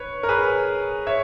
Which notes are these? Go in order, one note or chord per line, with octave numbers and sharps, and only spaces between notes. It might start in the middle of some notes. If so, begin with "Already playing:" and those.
Already playing: B4 C#5
A#4
G#4 B4
C#5 E5